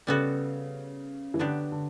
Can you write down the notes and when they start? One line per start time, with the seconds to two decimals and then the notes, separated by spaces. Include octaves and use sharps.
0.07 C#3 G3 B3 F#4 A4
1.34 E3
1.39 D3 F#3 B3 D4 G4
1.72 D3